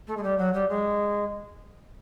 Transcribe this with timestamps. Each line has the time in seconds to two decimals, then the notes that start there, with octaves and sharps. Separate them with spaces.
0.07 A3
0.16 G#3
0.23 G3
0.38 F#3
0.53 G3
0.69 G#3